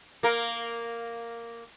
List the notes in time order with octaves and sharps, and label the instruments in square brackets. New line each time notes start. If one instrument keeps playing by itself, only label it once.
[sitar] A#3 A#4